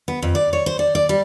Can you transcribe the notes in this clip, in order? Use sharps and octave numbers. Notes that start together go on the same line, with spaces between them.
B3
F2
D5
C#5
C5
D5
D5
G3